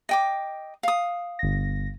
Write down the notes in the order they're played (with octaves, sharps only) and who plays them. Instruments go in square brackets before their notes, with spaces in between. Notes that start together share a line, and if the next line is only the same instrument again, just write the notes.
[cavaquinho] D#5 G5 D6
F5 D#6
[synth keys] G1 A#6